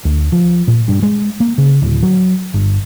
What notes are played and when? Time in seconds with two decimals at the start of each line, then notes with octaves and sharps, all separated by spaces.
0.05 D2
0.32 F3
0.68 A#2
0.88 G2
1.03 G#3
1.40 A#3
1.58 C#3
1.82 D1
2.03 F#3
2.54 G1